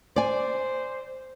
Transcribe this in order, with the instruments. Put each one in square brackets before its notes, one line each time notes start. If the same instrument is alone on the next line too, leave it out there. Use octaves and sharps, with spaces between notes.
[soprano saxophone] C5 [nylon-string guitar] D5 G#5